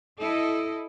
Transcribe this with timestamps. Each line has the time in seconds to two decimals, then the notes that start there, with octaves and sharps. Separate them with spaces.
0.21 E4 A4 D#5